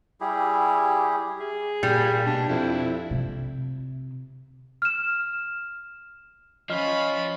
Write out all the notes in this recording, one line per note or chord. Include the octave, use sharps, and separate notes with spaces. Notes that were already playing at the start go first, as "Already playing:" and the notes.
G3 E4 G4 G#4
G#4
A#2 G3
B2 D4
F2 E4
C3
F6 E7
F3 C#4 F4 D#5 B5 F6